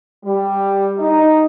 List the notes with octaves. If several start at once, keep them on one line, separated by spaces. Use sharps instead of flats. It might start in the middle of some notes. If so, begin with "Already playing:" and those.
G3
D#4